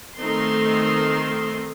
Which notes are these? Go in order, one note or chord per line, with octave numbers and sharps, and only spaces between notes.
D#3 A3 C4 D#4 C6